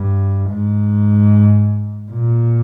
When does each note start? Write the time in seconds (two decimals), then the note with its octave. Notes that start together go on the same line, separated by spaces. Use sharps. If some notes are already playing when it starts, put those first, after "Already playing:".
Already playing: G2
0.49 G#2
2.12 A#2